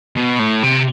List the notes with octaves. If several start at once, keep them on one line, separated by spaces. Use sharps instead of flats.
B2
A2
C3